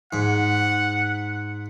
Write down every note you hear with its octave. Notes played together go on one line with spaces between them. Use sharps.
G#2 F#5